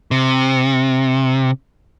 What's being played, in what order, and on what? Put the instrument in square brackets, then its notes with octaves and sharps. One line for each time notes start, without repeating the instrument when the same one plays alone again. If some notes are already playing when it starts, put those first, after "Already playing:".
[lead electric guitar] C3